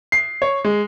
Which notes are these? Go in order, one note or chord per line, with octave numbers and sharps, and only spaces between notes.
C7
C#5
G#3